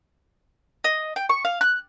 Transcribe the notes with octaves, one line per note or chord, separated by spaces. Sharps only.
D#5
G5
C#6
F5
F#6